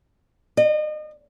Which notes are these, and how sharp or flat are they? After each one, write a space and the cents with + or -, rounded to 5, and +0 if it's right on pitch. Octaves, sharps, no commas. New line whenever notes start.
D#5 -35